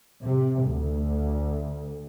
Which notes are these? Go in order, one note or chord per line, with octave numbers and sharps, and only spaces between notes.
C3
D2